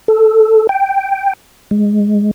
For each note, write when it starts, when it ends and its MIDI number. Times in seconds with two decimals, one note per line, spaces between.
0.08 0.67 69
0.69 1.33 79
1.71 2.31 56